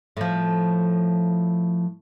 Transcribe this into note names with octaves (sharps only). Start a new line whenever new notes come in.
A2 F3